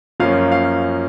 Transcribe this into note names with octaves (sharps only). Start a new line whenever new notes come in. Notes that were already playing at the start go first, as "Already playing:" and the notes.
F#2 F3 A#3 C#4 F5
F5